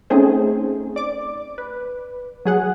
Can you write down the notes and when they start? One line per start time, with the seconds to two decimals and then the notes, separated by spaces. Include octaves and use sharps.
0.10 A3 C4 C#4 D#4 G#4 C5
0.96 D5 D6
1.58 B4
2.45 F#3 G#4 F#5